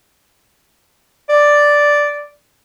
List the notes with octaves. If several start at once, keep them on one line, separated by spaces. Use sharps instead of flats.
D5